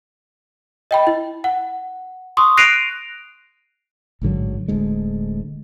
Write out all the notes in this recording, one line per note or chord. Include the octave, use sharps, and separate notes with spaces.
D#5 G5 B5
E4
F#5
C6 C#6 D#6
F#6 A#6 C7 D7 D#7 F7
A1 G#2 D3 F#3
D1 D2 G#3